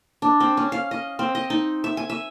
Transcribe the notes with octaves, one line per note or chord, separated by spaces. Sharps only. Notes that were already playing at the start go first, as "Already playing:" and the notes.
D4
C4
C#4
F5
D#5
C4
D#5
D#4
E5
G#5
E5